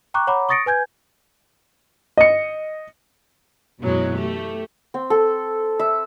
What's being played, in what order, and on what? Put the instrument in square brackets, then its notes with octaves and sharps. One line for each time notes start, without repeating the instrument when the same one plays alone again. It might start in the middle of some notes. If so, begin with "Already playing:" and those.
[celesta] G5 A#5 C#6 D6 F#6
C#5 F#5 A#5 B5 D6
C#6 D#6 A6 A#6 C#7 D7
B4 G#5 G6 G#6
[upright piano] D#5 C#7
[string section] F#2 B2 E3 F#3 G#3
A3 G4
[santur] C4
A4
E5